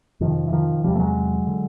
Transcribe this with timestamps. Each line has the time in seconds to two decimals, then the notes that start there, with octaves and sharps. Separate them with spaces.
0.20 F2 C3 D#3 F3
0.47 E3
0.53 D#3 F3
0.84 E2 C3 F3 G3
0.95 A3
0.99 F#3 G#3
1.47 D3